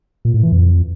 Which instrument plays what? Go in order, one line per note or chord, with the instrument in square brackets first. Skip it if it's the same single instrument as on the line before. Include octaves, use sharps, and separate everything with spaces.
[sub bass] A#2
A2
E3
F2